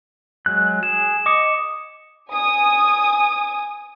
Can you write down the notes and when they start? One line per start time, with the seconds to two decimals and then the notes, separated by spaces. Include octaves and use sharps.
0.46 F#3 G#3 F#6
0.83 G#4 E7
1.26 D#5 D6 D#6 C#7
2.30 G#5 D#6